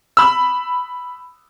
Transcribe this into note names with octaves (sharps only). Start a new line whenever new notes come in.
B5 E6